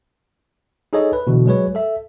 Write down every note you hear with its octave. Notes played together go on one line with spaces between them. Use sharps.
D#4 G#4 A4 C#5 D#5
B4
B2 D3 E3
F#3 G#3 G#4 B4 C#5
A4 E5